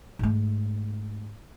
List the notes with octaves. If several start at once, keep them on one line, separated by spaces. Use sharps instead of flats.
G#2 A3